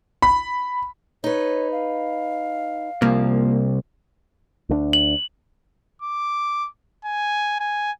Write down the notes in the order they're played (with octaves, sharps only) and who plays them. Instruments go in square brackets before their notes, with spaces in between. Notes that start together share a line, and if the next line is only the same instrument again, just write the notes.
[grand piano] B5
[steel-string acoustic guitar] D#4 B4 [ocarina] C#5
[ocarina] F5
[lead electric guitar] C2 [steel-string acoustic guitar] F3 [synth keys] A#3
[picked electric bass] D2 G#3 D4
[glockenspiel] F#7
[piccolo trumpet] D6
G#5
G#5